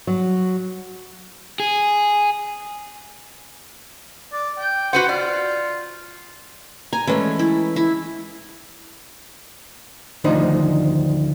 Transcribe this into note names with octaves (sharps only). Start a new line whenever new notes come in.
F#3
G#4
D5
G5
F#4 B4 C5 F#5
F4 D5
G#5 A#5
E3 G#3 A3 C#4
E4
E4
D2 D#3 F3 D4 D#4 C5